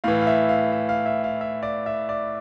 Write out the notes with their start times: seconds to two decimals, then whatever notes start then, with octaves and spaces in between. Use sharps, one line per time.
0.04 A2 E3 F5
0.21 F5
0.27 E5
0.49 F5
0.72 E5
0.89 F5
1.06 E5
1.24 F5
1.41 E5
1.63 D5
1.86 E5
2.09 D5